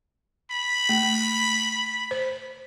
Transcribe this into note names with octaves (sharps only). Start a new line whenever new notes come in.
B5
A3
C5